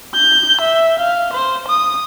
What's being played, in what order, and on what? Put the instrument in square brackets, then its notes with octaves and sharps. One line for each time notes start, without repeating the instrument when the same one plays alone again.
[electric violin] G6
E5
F5
C5
D#6